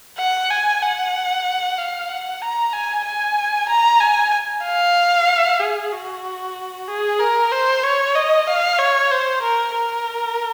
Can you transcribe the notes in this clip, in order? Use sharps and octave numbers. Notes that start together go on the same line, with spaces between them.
F#5
G#5
F#5
F5
F#5
A#5
G#5
G#5
A#5
G#5
F5
G#4
F#4
G#4
A#4
C5
C#5
D#5
F5
C#5
C5
A#4
A#4